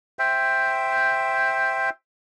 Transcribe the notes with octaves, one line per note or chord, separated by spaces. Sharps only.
C5 E5 G5